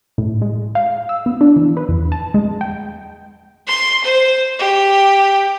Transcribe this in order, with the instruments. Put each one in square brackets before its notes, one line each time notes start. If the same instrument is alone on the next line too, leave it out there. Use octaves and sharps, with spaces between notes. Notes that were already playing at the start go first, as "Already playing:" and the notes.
[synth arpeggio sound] A2
G#3
F5
E6
B3
D4
E3
B4
E2
A5
G#3
G5
[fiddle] C6
C5
G4